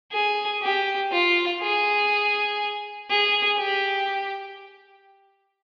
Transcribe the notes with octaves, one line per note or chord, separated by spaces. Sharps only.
G#4
G4
F4
G#4
G#4
G4